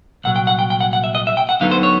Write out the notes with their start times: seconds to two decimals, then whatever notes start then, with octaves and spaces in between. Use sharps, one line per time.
0.24 C2 A#2 F#3 F#5
0.36 G5
0.47 F#5
0.59 G5
0.70 G5
0.81 F#5
0.93 F#5
1.04 E5
1.15 D#5
1.27 E5
1.37 G5
1.49 F#5
1.60 D2 D3 F#3 B3 D#4 F5
1.71 C5
1.83 C#5